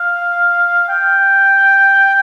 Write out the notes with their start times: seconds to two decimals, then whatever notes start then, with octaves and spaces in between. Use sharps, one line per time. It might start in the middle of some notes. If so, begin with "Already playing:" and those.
Already playing: F5
0.89 G5